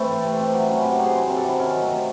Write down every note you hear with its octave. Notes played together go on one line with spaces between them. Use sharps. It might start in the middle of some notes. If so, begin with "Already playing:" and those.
Already playing: E3 A3 C4
A2
C3
C3
F#3
F#3 C#4
C3 E4
F#4
C3 G#4
F#3 C5
C3 C5
A4
C3 E4
D#3 C#4
F#3
A3
C3